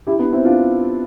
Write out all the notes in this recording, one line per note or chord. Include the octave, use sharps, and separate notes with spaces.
E4 G4
B3 D4
C4 E4
D4 F4